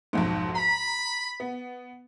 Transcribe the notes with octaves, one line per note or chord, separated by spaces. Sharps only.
B1 F2 G#2
A#5 B5
B3